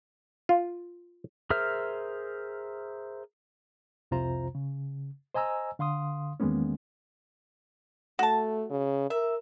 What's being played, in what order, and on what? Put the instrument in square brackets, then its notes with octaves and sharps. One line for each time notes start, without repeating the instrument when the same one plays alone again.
[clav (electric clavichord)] F4
[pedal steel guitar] G#4 A#4 C5 E5 F6
[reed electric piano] C2 F2 C3 F4 C5 A#5
C#3
C5 D#5 G#5 A#5 E6
D3 F5 C6 D#6
E2 D#3 G#3 A#3 B3 C#4
[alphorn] A3 [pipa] F#4 A5
[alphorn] C#3
[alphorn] A#4 [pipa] E5